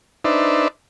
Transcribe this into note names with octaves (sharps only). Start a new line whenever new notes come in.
D4 D#4 B4 C5 D5 E5